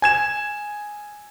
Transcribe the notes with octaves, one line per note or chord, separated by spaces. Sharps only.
G#5 G#6 E7